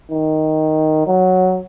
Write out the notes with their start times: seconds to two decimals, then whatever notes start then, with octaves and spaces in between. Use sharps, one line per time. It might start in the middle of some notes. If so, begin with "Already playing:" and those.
0.11 D#3
1.07 F#3